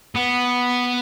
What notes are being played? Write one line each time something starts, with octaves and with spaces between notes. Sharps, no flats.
B3